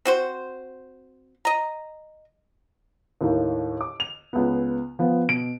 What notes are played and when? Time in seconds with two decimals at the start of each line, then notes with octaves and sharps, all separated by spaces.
0.05 C4 F#4 C5
1.45 D#5 A#5
3.21 D#2 A2 A#3 D#4
3.81 D6
4.00 F7
4.33 C#2 B3
4.99 F3 B3
5.29 B2 D7